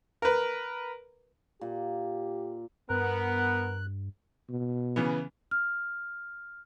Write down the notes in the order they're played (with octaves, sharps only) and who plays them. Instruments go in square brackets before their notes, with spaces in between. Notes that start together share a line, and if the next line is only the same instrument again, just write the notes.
[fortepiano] A#4 B4
[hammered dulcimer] A#2 [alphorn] G4
[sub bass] G2 [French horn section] B3 [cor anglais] A#4 [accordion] F#6
[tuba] B2
[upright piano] C#3 E3 B3
[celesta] F6